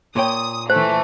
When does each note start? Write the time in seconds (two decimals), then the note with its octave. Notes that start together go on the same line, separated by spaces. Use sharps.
0.16 A#2 C#5 G5 D#6
0.70 E3 A3 C5